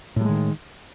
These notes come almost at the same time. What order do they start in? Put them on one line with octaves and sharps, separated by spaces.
A2 G3 G#3 D#3